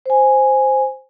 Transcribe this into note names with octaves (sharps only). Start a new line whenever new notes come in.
C5 G#5